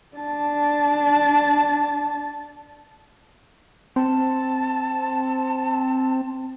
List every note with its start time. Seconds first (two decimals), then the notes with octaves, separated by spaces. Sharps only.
0.17 D4 A5
3.96 C4 A5